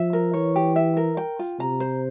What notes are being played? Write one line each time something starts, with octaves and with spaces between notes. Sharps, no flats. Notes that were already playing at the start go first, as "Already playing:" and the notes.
Already playing: F3 E5
A#4
E3 C#5
G4
E5
A#4
G5
F4
C3 A#5
C5